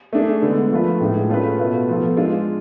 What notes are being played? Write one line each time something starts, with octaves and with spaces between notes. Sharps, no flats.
A3 D4 G#4
D3 G#3 B3
F3 A3 F4 B4
A2 G#3 D4 F4 G#4
A3 C#4 F4 G#4 B4
B2 A3 F4 B4
F3 B3 F4 A4
G#3 D4 F4 G#4